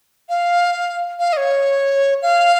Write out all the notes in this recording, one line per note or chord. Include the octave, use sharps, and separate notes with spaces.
F5
F5
D#5
C#5
F5